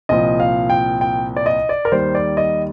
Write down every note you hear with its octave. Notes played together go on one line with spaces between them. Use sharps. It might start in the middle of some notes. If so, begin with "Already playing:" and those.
C2 A#2 F3 D#5
F5
G5
G5
D5
D#5
D5
A#4
D#2 D#3 G3 C5
D5
D#5